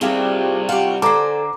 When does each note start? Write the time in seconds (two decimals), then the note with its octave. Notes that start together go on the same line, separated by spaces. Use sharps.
0.01 D#2 C3 G3 C4 D4 F4 G4 G#4
0.69 F4 G4 F#5
1.02 D3 A4 C5 G#5 A#5 D6